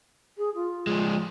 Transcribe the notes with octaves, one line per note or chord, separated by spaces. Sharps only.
G#4
F4
F3 G#3